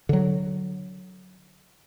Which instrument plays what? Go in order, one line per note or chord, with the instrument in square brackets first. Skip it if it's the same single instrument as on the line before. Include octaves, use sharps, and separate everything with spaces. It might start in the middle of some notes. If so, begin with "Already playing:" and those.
[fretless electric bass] D3 F#3